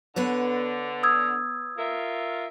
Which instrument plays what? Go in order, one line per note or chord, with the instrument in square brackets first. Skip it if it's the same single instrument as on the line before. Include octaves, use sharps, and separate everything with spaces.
[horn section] D3 [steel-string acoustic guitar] B3 B4 C#5
[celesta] D#6 E6 G#6
[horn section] F4 A#4 E5